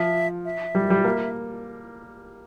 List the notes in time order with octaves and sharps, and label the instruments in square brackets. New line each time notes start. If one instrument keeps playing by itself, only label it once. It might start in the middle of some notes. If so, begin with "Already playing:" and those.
Already playing: [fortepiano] F3 [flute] E5
[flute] E5
[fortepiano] G3
G3
A#3